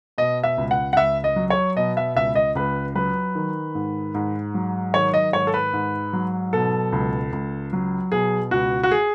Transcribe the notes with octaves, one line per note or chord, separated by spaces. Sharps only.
B2 D#5
E5
C#2
F#5
F#5
C#2 E5
D#5
F#3
C#5
B2 D#5
E5
C#2 E5
D#5
C#2 B4
F#3 B4
D#3
G#2
G#2
F#3
D#3 C#5
D#5
G#2 C#5
A4
B4
G#2
F#3
B2 A4
C#2
C#2
F#3
B2 G#4
C#2 F#4
F#4
G#4